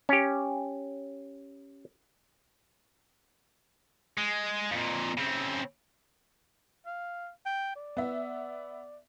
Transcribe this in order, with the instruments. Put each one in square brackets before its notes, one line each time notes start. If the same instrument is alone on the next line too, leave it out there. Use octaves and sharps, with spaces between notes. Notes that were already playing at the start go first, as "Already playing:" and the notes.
[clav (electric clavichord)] C#4 G4
[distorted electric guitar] G#3
F2 A#2
C#3 C4
[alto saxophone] F5
G5
D5
[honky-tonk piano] B3 E5